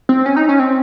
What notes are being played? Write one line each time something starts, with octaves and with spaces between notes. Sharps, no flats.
C4
C#4
D#4
C#4
C4